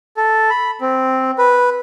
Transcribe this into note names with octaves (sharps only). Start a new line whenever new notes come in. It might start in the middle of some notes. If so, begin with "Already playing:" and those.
A4
B5
C4
B4